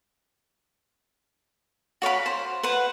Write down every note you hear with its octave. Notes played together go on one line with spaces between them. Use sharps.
F#4 C#5 F5 B5
C5
B4 C5 F#5